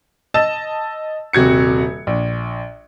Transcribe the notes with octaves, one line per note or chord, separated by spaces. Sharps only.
D#5 A5 E6 A6 E7
D#1 C3 F#4 G#6 C#7
A#1